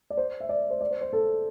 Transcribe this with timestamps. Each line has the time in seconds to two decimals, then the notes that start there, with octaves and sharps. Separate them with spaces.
0.10 D5
0.17 C5
0.40 E5
0.49 D5
0.71 C5
0.81 D5
0.91 C5
1.01 C5
1.13 A4